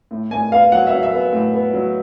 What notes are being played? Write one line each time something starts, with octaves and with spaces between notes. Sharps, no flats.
A2
A2 G#5
B3 F5
F#3 F#5
E5
F#3
E5
B3
A2
B3
F#3